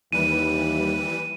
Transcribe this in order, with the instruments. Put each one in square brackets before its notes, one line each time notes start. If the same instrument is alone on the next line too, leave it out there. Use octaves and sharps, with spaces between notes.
[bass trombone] D#2 [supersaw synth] E3 G3 B4 [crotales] D#7